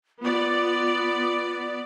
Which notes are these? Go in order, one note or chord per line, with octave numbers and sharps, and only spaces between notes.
B3 F4 D5